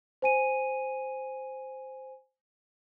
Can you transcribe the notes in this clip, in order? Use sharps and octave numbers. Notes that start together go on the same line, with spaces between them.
C5 G#5 D#7